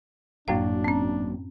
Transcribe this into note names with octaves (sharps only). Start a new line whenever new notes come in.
G#1 F#2 A2 F#3 A#3 D4 F5
C4 C#4